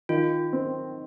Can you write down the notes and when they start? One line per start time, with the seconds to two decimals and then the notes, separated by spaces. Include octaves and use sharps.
0.09 D#3 F4
0.53 C4